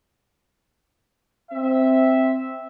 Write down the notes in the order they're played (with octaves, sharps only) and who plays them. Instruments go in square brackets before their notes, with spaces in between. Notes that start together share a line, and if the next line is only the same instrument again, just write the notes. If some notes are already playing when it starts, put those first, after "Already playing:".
[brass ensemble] C4 E5